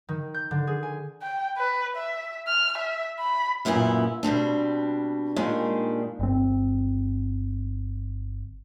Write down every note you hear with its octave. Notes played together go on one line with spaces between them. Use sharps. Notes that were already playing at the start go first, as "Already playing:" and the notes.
D#3
G6
D3
G#4
G#5
G5
B4
E5
F6
E5
B5
F#2 A#2 C#3 B3 E4
B2 G3 C4 D4
A#2 D#3 G3 G#3 D4
G1 C4